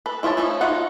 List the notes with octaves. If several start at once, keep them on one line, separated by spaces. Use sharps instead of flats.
A4 B4
E4 F4 C#5 D#5 A5
F3 A3 C#4 D#4 E4
D#4 F4 F#4 F#5